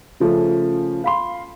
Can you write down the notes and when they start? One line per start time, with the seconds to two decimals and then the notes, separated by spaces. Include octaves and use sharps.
0.20 C#3 F3 A3 C#4
1.04 F5 B5 C6